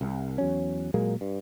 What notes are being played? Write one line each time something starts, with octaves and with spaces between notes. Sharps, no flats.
C2
E2 F#3 C#4
A#2 F#3 G#3 A#3
G2